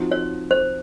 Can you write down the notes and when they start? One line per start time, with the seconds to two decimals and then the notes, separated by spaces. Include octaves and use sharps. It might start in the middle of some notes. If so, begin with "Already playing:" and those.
Already playing: F3 C4 D#4 F#4
0.11 C#5
0.51 C5